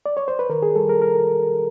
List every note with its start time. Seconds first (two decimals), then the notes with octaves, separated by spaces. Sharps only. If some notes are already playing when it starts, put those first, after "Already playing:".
0.06 D5
0.17 C#5
0.28 C5
0.39 B4
0.49 D#3 A#4
0.62 G#4
0.76 G3 A4
0.89 A#4
1.02 A#4